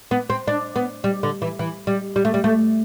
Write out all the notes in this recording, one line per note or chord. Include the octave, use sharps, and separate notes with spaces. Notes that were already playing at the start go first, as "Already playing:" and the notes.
B3
C4
D4
B3
G3
D3
E3
E3
G3
G3
A3
G3
A3